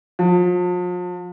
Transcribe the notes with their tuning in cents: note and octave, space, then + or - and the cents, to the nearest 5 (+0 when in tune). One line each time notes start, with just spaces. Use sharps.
F3 +40